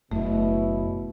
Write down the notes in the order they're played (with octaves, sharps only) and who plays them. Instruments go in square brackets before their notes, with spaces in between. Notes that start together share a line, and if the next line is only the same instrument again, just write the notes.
[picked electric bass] F#1 [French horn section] B2 E4 [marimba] A3